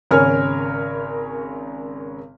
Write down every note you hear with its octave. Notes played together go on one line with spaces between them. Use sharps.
G#1 C#3 A#4 C#5 G#5 F6